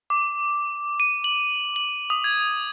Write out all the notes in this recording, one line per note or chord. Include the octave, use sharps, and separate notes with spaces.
D6
D#7
F#7
F#7
D#6
G#6